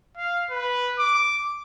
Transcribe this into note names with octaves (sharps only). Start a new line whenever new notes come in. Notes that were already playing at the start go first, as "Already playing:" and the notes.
F5
B4
D6